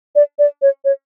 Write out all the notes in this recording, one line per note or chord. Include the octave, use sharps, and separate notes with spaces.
D5
D5
C#5
C#5